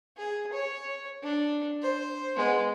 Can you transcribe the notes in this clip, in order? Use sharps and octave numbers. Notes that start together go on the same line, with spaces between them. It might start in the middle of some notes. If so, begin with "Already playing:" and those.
G#4
C#5
D4
C5
G#3 B3